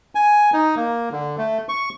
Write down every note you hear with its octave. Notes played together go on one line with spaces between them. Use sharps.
G#5
D#4
A#3
D3
A3
C#6